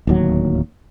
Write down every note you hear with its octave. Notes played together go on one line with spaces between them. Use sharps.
D1 D#2 F#3